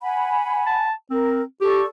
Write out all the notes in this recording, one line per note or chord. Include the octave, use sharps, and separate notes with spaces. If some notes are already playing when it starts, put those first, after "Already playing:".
F#5 G#5 B5
A5
C4 A#4
G4 A4 D5 C#6